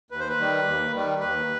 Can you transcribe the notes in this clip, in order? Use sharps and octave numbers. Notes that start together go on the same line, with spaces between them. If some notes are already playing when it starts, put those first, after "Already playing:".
D#2 B4
C5
B4
D#3 G3
D#2
D#3 G3
D#2 B4